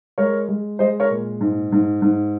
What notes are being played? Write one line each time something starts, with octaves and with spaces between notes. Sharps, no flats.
G#3 A#4 C#5
G#3
G#3 C5 D#5
A#4 C#5
A#2
G#2
G#2
G#2